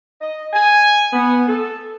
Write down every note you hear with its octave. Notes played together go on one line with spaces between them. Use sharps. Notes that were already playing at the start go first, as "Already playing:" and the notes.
D#5
G#5
B3
A4